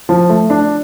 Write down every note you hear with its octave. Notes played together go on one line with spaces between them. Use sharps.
F3
A3
D4